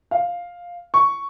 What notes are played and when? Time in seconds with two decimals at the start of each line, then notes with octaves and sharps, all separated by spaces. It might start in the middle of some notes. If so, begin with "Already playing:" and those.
0.11 F5
0.94 C#6